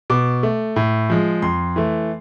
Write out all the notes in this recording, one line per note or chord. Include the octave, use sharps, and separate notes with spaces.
B2 D6
A3
A2
F3 G#3
F2 C6
E3 A3